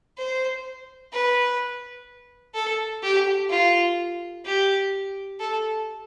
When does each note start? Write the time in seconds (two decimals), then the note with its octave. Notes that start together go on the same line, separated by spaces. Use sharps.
0.18 C5
1.13 B4
2.54 A4
3.03 G4
3.50 F4
4.45 G4
5.40 A4